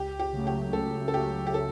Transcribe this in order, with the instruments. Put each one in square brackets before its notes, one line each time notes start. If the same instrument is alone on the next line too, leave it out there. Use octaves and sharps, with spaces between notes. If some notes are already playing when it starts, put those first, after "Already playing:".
Already playing: [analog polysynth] C#2 [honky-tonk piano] G4
[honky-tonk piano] G4
[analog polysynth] C#3 F#3 A3
[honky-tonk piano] G4
[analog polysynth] C#2 [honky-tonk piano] A4
[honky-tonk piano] A4
[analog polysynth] C#3 F#3 A3 [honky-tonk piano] G4
[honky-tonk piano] G4
A4